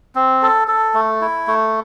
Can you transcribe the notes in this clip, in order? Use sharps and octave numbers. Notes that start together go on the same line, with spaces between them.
C4
A4
A4
A3
E4
A3